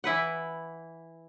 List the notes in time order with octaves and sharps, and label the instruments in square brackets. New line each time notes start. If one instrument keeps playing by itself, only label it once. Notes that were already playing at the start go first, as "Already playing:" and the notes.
[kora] E3 E4 B4 F#5